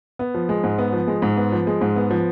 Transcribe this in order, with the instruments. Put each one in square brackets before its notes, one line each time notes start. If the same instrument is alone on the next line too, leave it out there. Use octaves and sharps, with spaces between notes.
[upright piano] B3
F3
G#3
G#2
B3
F3
G#3
G#2
B3
F3
G#3
G#2
B3
F3